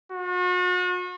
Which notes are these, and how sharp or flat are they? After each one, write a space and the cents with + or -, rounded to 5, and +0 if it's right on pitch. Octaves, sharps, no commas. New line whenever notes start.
F#4 -40